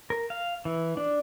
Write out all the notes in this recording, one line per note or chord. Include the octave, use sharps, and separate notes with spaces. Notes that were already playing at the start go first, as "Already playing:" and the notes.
A#4
F5
E3
D4